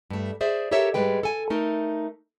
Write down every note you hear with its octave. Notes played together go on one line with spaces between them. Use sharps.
G2 A3
G#4 C5 D5 E5
G4 A4 A#4 C#5 E5
G#2 G3 G#3 B4 G5
A4 G#5
A3 D#4 A#4